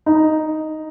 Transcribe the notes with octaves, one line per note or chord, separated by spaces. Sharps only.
D#4